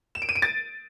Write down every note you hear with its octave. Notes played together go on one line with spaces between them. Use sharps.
E7
D7
D#7
D7
A6